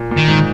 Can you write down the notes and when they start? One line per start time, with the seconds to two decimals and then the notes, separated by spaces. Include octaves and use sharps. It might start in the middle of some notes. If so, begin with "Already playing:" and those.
Already playing: A#2
0.11 A#2
0.17 D#3
0.28 G#2